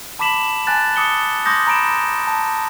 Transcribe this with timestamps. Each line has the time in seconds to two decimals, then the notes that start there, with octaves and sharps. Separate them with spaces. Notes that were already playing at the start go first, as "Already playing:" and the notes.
0.19 A5 B5 D6 B6 E7 F#7
0.67 G#5 A5 F#6 A6
0.96 D6 D#6 C#7 G7
1.46 C6 D6 D#6 G6 A#6
1.67 A#5 B5 D7 E7
2.27 A5